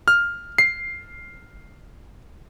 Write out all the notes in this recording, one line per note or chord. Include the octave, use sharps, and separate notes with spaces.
F6
C7